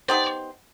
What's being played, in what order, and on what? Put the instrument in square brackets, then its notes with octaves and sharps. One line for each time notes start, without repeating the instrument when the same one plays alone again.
[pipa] B3 D#4 G4 C5 [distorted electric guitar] D5